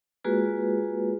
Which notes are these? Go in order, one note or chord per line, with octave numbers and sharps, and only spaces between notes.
G#3 A#3 F4 F#4 G#4 B4